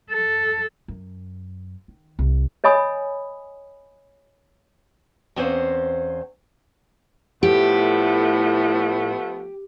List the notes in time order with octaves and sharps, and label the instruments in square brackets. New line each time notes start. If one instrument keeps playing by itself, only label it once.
[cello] A4
[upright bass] F#2
D#3
C2
[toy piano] C#5 D#5 G#5 B5 D#6
[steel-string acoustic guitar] E2 C4 C#4 C5 F5
[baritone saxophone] A2 [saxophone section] F3 A3 B3 [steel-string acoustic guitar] G4